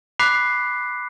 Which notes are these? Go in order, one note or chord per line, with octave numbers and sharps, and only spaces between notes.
B5 D6 F#6 B6 C7